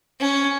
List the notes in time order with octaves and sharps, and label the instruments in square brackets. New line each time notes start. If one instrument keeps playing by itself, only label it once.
[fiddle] C#4